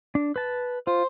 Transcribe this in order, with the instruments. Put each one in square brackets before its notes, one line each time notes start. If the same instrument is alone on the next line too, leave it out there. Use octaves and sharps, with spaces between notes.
[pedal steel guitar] D4
B4 A5
[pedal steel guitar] F4 [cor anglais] C5